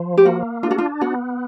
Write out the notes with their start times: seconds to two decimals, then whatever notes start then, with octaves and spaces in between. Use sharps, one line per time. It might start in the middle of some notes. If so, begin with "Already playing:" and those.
Already playing: F3
0.17 G4
0.25 A#3 F#4
0.63 D4 F4
0.71 F#4
0.78 F4
1.01 B3 F#4